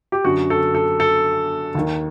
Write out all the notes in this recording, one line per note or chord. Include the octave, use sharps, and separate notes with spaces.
G4
F#2 D3 F#4
A4
A4
A4
D#2 D#3